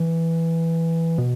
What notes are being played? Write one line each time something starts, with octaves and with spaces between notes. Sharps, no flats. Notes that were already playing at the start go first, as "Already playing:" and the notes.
Already playing: E3
B2